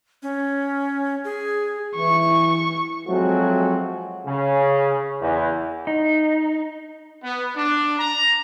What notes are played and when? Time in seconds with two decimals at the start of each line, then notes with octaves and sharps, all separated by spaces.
0.23 C#4
1.25 G#4
1.97 E3 C#6
3.08 F3 F#3 G#3 A3 C4 F#4
4.26 C#3
5.21 E2
5.87 D#4
7.23 B3
7.56 D4
7.99 A#5